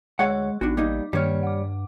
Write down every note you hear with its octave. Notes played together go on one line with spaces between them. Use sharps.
D2 G#3 G#4 C#5 F#5 C#6 F#6
A1 B3 D4 D#4 F#4
G3 A#3 D#4 D#5 D6
G2 D#3 G3 A#3 C#5 F6
F#5 D6